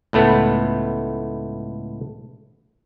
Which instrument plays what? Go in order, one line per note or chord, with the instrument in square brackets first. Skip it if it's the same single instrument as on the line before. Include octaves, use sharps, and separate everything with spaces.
[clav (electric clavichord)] C#2 A2 A3 B3